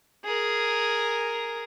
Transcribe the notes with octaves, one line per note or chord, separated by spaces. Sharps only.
G#4 A#4